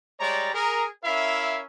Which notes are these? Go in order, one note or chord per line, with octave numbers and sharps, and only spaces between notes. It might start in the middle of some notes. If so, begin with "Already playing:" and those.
G3 G#3 C#5 D5 A#5
G#4 A#4
C#4 E4 A#4 E5 F5